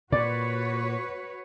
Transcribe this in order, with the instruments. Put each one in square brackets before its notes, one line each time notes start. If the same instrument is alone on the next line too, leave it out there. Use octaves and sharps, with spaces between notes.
[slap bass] A#2 [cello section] F#4 B4 C#5 [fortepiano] D5